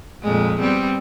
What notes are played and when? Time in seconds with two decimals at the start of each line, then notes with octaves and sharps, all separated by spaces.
0.23 F2 A#2 G#3
0.61 G3 B3 C4